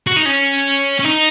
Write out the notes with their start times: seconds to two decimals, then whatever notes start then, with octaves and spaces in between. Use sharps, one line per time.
0.07 F#4
0.16 D#4
0.26 C#4
1.00 C#4
1.05 D#4